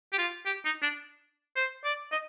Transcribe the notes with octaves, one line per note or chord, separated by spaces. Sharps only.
G4
F4
G4
D#4
D4
C5
D5
D#5